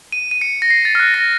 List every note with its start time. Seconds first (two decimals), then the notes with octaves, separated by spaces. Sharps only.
0.12 D#7
0.31 D#7
0.41 C#7
0.62 A#6
0.70 C7
0.85 A6
0.95 F6
1.00 F#6
1.14 A#6